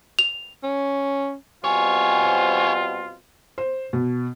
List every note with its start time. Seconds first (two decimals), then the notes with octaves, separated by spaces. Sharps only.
0.19 F7
0.63 C#4
1.64 B2 G3 C4 F4 C5 C#5 G#5
3.58 C5
3.93 B2